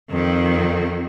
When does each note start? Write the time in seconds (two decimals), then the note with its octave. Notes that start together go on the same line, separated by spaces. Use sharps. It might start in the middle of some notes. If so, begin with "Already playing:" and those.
0.10 F2 D#3